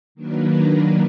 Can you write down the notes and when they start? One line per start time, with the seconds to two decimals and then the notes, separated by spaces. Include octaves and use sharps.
0.15 D#3 F#3 A#3 D4 A#4 B4